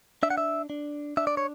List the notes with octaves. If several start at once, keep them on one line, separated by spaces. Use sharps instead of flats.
D4 E5
F#5
E5
D4
D4 E5
D5
C#5